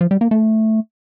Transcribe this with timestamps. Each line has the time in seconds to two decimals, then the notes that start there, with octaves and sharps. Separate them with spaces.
0.01 F3
0.11 G3
0.21 A#3
0.31 A3